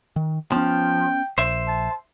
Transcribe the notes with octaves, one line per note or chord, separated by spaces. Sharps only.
D#3
F3 B3 C#4 G5
A#1 C5 E5
A5